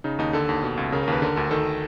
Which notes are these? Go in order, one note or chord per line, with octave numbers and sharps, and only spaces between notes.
C#3 D#4
D#2 D#4
D3 A4
D#2
B2
C#2
C#3 A#4
A#4
D#2 B4
D3 A#4
D2 A4
D#3 A4